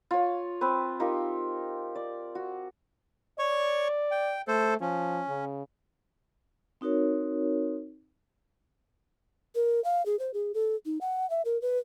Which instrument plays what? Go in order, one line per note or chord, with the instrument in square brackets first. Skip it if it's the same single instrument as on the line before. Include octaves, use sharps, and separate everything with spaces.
[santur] F4 C#5
C4 B4
D#4 F4 G4 A#4
D5
F#4
[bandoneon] C#5 C#6 [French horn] D5
[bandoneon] G5
[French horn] A3 [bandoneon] A4 C5
[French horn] F3 [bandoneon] C#4
[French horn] C#3
[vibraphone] C4 D#4 F#4 A#4 C#5
[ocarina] A#4
F5
G#4
C5
G#4
A4
D#4
F#5
E5
A#4
B4